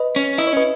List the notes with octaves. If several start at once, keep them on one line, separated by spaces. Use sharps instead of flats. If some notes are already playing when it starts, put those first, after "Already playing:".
Already playing: B4 D#5
C#4
E4 D#5
C#5
C#4 B4 D#5